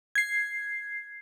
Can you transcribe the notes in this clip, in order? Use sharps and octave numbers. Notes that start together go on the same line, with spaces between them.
G#6 C7